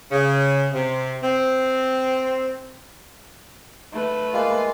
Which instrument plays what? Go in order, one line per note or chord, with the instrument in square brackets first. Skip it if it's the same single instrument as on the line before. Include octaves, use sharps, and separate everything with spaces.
[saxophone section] C#3
C3
C4
[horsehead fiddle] A3 B4
[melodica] G#3 A#3 F4